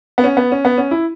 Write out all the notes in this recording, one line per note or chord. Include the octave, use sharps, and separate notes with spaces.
B3
C#4
B3
C#4
B3
C#4
E4